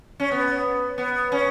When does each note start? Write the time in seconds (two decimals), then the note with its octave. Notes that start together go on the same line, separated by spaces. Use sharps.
0.20 C#4
0.31 B3
0.98 B3
1.32 C#4